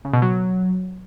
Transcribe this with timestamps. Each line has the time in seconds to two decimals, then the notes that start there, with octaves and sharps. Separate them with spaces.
0.05 C#3
0.13 B2
0.22 F#3